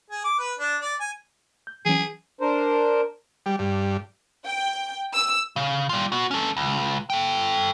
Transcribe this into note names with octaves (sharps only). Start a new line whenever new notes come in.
G#4
D6
B4
D4
D5
G#5
G6
E3 F#3 C#4 G#4
D4 A#4 C5
G3
G2
G5
E6
C#3
G3 F4
B3 F#4
C#4 A4
C#2
A4 G5